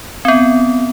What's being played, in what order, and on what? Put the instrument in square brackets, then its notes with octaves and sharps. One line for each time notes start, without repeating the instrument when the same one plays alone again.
[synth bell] B3 C4